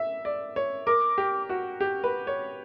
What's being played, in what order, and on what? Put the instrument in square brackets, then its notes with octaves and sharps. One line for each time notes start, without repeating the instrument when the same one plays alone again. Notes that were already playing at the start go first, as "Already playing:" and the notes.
Already playing: [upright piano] E5
D5
C#5
[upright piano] A#4 [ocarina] D6
[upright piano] G4
F#4
G4
B4
C#5